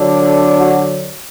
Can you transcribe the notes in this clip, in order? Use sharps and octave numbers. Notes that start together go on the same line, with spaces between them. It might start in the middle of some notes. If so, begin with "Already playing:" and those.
Already playing: D3 F#3 D4
A4
F#4